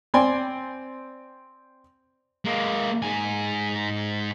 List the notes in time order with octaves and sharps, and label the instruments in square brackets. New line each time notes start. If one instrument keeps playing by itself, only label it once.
[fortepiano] C4 D5 G5 G#5 C6
[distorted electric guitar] G#3 A#3
G#2 G#5